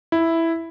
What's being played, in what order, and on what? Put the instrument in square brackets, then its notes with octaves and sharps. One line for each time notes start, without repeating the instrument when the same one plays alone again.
[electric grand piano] E4